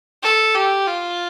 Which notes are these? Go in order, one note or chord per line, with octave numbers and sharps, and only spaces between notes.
A4
G4
F4